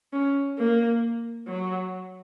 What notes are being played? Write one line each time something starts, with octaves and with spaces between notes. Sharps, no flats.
C#4
A#3
F#3